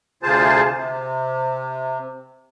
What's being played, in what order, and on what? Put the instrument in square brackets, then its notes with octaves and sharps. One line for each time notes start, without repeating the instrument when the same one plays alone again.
[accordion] D2 C3 F4 G#4 C5 A5
C3